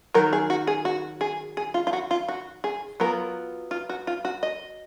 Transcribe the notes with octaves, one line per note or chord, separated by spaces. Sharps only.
D#3 F#3 A#4
G#4
F#4
G#4
F#4
G#4
G#4
F4
F4
F#4
F4
F#4
G#4
F#3 B3 F4 A#4
F4
F#4
F4
F#4
D#5